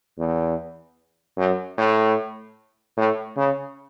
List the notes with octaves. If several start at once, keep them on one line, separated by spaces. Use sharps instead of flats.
E2
F#2
A2
A2
C#3